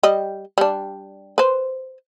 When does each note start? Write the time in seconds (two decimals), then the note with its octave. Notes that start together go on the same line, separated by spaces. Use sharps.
0.03 G3 D#5
0.58 G3 D4
1.38 B4 C5